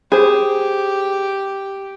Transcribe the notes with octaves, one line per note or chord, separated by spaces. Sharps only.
G4 G#4 C5